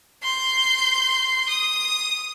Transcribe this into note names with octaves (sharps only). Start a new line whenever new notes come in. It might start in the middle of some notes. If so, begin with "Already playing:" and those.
C6 G6
D#6